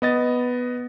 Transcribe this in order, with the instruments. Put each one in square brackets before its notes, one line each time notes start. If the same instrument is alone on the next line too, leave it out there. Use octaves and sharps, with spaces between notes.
[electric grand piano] B3 D#5 A6